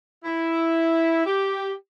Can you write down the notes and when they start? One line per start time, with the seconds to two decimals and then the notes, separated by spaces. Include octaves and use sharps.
0.25 E4
1.26 G4